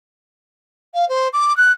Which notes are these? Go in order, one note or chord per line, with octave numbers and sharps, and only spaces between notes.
F5
C5
D6
F#6